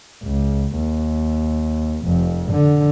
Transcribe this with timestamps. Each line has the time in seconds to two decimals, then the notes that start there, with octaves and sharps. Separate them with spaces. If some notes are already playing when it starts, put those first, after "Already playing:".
0.24 C#2
0.77 D#2
2.04 F1 F2
2.52 D3